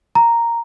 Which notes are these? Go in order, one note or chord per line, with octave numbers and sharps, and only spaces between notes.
A#5